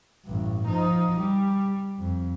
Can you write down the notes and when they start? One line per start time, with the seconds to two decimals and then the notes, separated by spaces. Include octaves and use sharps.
0.24 A1 G2
0.68 F3 D#4
1.20 G3
1.99 F2